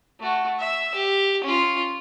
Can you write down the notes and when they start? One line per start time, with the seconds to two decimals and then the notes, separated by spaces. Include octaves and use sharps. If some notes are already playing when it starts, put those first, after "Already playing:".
0.20 A3 F#4
0.59 E5 E6
0.94 G4
1.44 C#4 F4